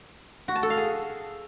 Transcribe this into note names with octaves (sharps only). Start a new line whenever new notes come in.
F#4
A5
A4
F5
G#4